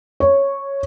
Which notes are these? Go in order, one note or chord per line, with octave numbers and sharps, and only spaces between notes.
C#5